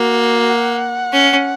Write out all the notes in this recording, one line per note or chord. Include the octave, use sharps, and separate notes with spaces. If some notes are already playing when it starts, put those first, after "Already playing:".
Already playing: A#3 F#4
F#5
C#4